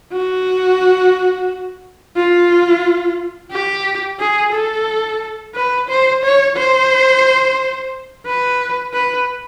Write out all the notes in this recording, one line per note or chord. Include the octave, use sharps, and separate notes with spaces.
F#4
F4
G4
G#4
A4
B4
C5
C#5
C5
B4
B4